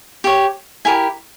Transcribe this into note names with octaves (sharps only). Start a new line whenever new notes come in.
G4 C#5
E4 G4 A#4 G#5